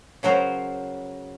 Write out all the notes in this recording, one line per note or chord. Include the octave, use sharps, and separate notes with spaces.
C#3 F#3 A#4 C5